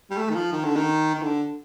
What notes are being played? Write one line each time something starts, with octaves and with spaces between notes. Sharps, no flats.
G3
A3
D#3
F3
D#3
D3
D#3
D#3
D3